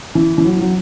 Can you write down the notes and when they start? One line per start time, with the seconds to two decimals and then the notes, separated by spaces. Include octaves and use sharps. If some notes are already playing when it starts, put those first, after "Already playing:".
0.15 E3
0.38 E3
0.45 F#3
0.60 F#3